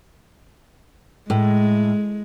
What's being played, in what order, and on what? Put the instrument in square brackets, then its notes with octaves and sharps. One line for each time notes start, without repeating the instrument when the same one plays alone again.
[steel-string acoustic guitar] A2 [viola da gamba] G#3